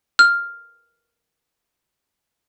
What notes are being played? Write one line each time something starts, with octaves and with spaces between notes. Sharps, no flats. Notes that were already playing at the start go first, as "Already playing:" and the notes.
F6